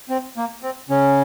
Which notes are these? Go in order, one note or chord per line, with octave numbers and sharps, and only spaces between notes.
C4
A#3
C4
C#3 C#4